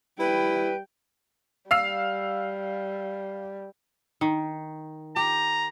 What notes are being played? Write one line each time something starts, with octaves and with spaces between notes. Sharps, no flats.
G3 E4 B4 G5
G3 F5 E6 C7
D#3
G4 A#5